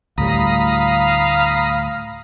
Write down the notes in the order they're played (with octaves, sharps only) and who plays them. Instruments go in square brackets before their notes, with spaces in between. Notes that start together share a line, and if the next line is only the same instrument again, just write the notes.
[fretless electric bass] D2 A2 G3 [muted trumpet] F5 [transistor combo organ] A#5 B5 D#6